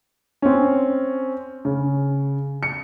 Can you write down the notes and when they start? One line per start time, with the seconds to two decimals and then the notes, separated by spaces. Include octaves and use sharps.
0.42 C4 C#4
1.65 C#3
2.63 C#7